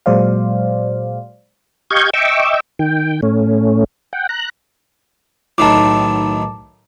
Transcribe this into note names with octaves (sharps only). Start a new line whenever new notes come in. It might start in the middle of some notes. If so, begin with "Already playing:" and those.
A#2 F#3 G#3 C5 D5 F5
G4 D#5 F5 C#6 G6 G#6
D#5 E5 G5 C#6 D6 E6
D#3 G5
A2 A3 C#4
F#5 G5
A#5 F#6
B1 A2 D#3 A5 D6